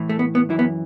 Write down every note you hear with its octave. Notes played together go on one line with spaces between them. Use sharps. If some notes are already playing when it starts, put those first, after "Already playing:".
Already playing: A2 E3
A3
B3
B3
F#2 E3 E4
B3